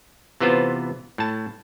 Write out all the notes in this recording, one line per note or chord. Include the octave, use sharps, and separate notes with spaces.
C3 E3 B3 F4 C5
A2 A5